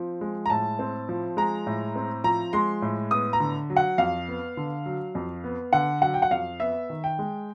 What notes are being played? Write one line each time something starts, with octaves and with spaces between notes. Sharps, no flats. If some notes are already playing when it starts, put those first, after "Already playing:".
Already playing: F3 C4
G#3
A#5
A2 A5
C4
F3
G#3 A#5
A2
C4
F3 A#5
G#3 C6
A2
B3 D#6
A#5
D3
F#3
F#5
F2 F5
B3
D3
F#3
F2
B3
D3 F#5
F#3 F#5
G5
F#5
F2 F5
B3 E5
D#3
G5
G#3